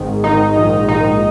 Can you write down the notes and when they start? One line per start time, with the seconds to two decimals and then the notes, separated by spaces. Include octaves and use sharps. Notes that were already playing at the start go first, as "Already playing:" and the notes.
Already playing: G#1 G#2 D#3
0.24 G#1 G#2 D#3 D#4
0.56 A#1 G#2 D#3
0.89 A#1 G#2 D#3 D#4